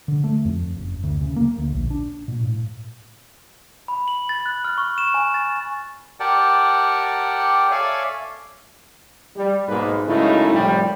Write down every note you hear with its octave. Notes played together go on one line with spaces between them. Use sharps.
D3
A3
F2
F#1
D2
C#3
A#3
D2
A#1
D4
A#2
A2
B5
F#7
A6
F#6
F6
C#6
E7
G#5
A6
G4 A#4 D5 F#5 G5 A5
A4 C#5 D5 E5 F5 G#5
G3
B1 G#2 G#3 A#3 B4
F#2 C#3 G#3 A3 D#4 E4
C2 A2 F3 G3